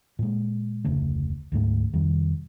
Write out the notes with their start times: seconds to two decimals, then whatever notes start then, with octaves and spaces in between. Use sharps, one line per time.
0.19 A#2 G#3
0.85 F1 D2 C#3 A3
1.52 D2 G#2 A3
1.94 F2 C3 D#3 G3